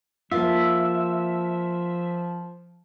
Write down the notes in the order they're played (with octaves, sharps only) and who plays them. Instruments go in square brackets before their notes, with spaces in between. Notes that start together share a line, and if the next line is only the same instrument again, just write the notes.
[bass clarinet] F3 [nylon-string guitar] A#3 F4 [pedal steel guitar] E5